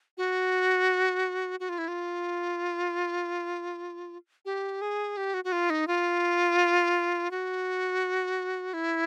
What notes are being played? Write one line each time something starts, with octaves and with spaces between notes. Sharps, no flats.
F#4
F#4
F4
E4
F4
G4
G#4
G4
F#4
F#4
F4
D#4
F4
F#4
E4